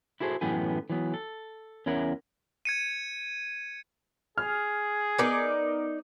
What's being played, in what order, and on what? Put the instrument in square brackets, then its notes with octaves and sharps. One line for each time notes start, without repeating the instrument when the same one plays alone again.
[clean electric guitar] E4 F#4 G#4 A4 C5
F#2 A2 E3 B3 G4 G#5
E3 F#3 B3
A4
E2 C#4 E4 A#4 F#5
[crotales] G#6 C#7 D#7
[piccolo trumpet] G#4 [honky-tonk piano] F6
[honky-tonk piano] B3 A#4 D6 [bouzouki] D#4 D5